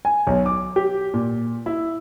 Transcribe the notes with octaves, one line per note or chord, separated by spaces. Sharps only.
G#5
B1
D6
G4
A#2
E4